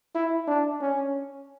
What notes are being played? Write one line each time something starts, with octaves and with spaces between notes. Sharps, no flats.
E4
D4
C#4